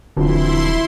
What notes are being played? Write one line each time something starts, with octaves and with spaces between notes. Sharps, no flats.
D#1 F2 D3 E3 F#3 E4 C6